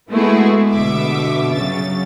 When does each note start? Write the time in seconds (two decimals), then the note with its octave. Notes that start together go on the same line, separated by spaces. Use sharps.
0.10 G#3 A3 B3 E4 F#4 G#4
0.71 G1 B2 D3 E5 D6
1.54 C#3 F#3 A6